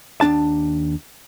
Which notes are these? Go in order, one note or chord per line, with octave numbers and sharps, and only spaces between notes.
D#2 G#2 D4 A5